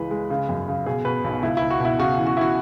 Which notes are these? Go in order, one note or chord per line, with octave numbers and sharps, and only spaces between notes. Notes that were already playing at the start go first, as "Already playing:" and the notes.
Already playing: C#2 E3 G#3 B4
G#3
C#3
F#2
C#3
B2 G#4
B2 B4
B1
C#2 E4
C#2 E4
F#4
B2 E4
C#3 F#4
E3
F#4
E3 E4 F#4